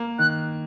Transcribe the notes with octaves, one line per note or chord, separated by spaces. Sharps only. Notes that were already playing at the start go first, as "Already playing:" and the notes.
Already playing: A#3
D#3 F#6